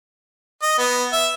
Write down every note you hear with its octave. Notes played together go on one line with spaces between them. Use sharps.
D#5
B3
E5